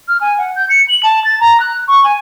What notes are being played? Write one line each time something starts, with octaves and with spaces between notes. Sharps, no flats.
F6
G#5
F#5
G6
C#7
F#7
A5
A6
A#5
F#6
C#6
G#5